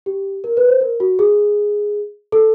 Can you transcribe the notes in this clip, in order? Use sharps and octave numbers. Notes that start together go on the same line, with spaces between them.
G4
A#4
B4
C5
A#4
F#4
G#4
A4